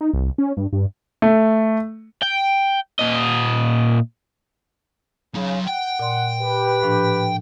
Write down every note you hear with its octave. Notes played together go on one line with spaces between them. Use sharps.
D#4
C2
C#4
G2
G2
A3
G5
A#2 D#5
C#3 F#3 D#4
F#5 G5
A#2 D5 C6
G4 B4
A2 F3 D4